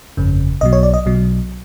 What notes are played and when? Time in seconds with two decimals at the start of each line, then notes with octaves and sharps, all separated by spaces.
0.17 G1 F2 C#3
0.61 B1 B2 F#3 D#5
0.73 C#5
0.83 D5
0.94 D#5
1.05 B1 B2 F#3